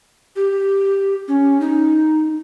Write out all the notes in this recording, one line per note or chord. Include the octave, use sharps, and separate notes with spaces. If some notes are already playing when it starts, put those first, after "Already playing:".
G4
C#4
D#4